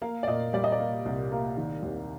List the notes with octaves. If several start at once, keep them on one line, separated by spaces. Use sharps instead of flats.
A#3 F5
D5
A#2 D#5
G3 D5
D#5
D5
A#3
C2
A#3
D#3
D#2